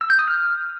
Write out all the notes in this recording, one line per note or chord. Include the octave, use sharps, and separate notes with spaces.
E6
G6
D#6
F6